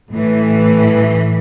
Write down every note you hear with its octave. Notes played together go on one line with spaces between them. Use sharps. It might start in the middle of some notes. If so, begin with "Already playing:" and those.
A1 A2 E3